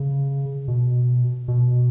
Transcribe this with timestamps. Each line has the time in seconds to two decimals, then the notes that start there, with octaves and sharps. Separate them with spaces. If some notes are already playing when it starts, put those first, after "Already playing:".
Already playing: C#3
0.68 B2
1.48 B2